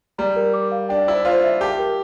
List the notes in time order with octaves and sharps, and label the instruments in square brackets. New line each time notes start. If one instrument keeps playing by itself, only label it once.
[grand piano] G3 [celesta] A#5
[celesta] A#4
D6
F5
[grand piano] D4 [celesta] G5
[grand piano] E4 [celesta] C5
[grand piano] F4 [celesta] C5
[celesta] E5
[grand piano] G4 [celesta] A5
[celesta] A#4